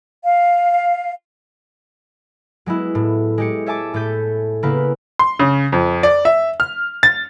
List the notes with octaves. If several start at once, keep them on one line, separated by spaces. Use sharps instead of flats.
F5
F#3 G#3 B3 E4
A2
G#3 G4 C#7
C#5 E5 G#5 A5 D6
A2 A3 A5 G6 B6 D#7
C#3 A#3 B3 E4 B4
C6
C#3
F2
D5
E5
F6
A6